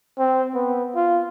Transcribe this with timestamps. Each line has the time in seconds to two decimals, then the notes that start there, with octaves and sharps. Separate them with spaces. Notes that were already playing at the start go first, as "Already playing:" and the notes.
0.19 C4
0.54 B3
0.96 F4